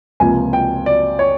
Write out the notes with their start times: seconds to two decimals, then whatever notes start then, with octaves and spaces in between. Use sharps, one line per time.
0.20 C#2 C3 F3 A#3 G#5
0.53 G5
0.86 D5
1.19 C#5